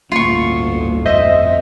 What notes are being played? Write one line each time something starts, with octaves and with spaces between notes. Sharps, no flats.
G1 D2 A2 A#3 C#4 F4 C#6
F2 C5 D#5 E5